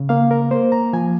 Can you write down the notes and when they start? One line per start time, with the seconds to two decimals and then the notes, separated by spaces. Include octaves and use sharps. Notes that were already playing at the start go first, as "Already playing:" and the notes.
Already playing: C#3
0.09 A#3 F5
0.31 A#4
0.51 A#3 C5
0.72 A#5
0.93 F3 G#5